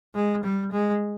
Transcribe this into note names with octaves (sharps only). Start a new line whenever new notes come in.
G#3
G3
G#3